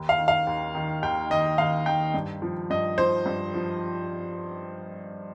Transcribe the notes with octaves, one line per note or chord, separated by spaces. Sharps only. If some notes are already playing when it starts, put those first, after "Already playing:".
Already playing: D#2
F5
D#3
F5
D#2
D#3
D#2 G5
D#3 D#5
D#2 F5
D#3 G5
G2
F3
G2 D#5
F3 C5
G2
F3